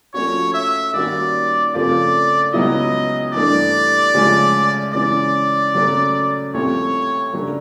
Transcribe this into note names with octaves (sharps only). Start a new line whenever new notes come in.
F3 A3 C#4 F#4 C#5
E5
D#3 G3 A#3 C#4 F#4 D5
C#3 F3 A3 C4 F4 D5
C#2 C#3 F#3 B3 E4 D#5
G2 E3 A3 D4 D5
D2 C#3 F3 G#3
C#3 E3 G#3 C#4 D5
C#3 F#3 A3 C#4
C2 C3 F3 A3 C4 C#5
C#3 F#3 A3 D4